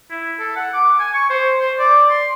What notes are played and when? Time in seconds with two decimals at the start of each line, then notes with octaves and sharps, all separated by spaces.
0.10 E4
0.39 A4
0.56 F#5
0.74 D6
0.99 G#5
1.15 C#6
1.30 C5
1.59 C5
1.79 D5
2.10 C6